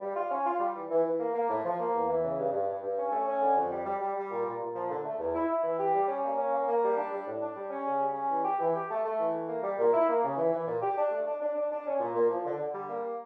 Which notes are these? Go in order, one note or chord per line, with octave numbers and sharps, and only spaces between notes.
G3
F4
C#4
F4
G3
E3
E3
E3
A#3
A#3
A2
F3
A#3
E2
E3
C#3
G2
G2
G2
G2
C#4
A3
C#4
D3
F2
G3
G3
G3
G3
A#2
A#2
A#2
F3
D3
A3
E2
E4
E4
E3
G4
G3
C#4
A#3
C#4
A#3
A#3
G3
D4
G3
A2
D4
G3
C#4
C#3
G3
C#4
E3
G4
E3
G4
A3
A3
E3
A3
A#3
G3
A#2
E4
A#3
C#3
E3
E3
A#2
G4
D4
A3
D4
D4
D4
D4
C#4
A#2
A#2
F3
D3
D3
G3
A#3